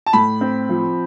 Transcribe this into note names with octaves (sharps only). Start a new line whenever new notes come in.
A5
A2 B5
C4
F3